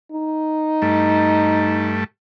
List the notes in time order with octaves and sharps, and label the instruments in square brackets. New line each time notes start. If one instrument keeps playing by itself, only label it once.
[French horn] D#4
[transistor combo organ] G2 A3